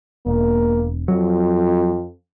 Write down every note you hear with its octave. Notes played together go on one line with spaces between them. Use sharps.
E1 A#3
F2 F#3